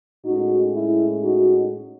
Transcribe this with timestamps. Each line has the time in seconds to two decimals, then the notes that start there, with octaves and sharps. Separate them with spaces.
0.25 A2 G#3 C#4 D#4 F#4
0.73 E4
1.22 D#4 F#4